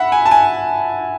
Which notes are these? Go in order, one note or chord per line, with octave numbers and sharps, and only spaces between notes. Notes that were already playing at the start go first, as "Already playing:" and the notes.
Already playing: E5 F#5 B5
G#5
A5
G#5